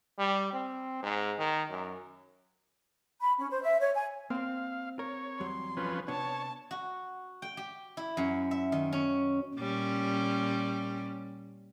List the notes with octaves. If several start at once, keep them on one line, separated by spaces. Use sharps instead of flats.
G3
C4
G#2
D#3
F#2
B5
C#4
C5
E5
C#5
G#5
A#3 C4 F5 C6
A#4 C#5
E2 F#3 G3 C6
F3 C#4 B4
C3 B3 D4 C#5 A5
F#4
G5
G4
E4
F#2
E5
D#3
C#4
A#2 G3 C#4